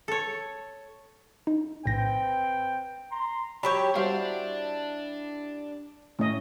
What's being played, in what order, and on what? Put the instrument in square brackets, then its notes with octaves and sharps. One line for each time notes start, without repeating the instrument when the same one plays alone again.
[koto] A4 C#5
[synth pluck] D#4
[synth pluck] A#1 A2 A#6 [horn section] C4 B4 G5
[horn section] A#5 C6
[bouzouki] F#3 G4 C#5 [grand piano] B5 G6
[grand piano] G3 [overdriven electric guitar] D4 [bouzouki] E4 [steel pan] F#4 C5 F5
[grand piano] A2 [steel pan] C#4 D#5